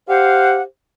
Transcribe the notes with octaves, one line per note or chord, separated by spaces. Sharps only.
G4 C5 F5 F#5